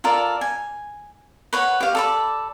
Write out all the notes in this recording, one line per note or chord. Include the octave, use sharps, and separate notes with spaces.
F4 A4 A#4 D5
G#5
B4 C#5 F#5
G4 F5
A4 D5 B5